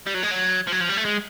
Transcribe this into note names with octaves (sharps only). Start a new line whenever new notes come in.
G3
F#3
G#3
F#3
F3
F#3
F3
G3
A3
G#3